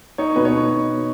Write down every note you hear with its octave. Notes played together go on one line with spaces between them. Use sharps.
D#4 C#5
B2 B4
C#5
B2